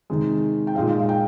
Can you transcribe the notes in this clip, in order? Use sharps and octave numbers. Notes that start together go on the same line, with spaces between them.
C3 D#3 G#3
G5
A#2 G#3 D#4 F5
F5
G5